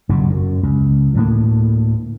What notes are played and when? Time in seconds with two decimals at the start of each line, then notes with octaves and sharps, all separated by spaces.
0.09 F#1 G2 B2
0.30 F#2
0.63 C#2
1.14 D2 A2 A#3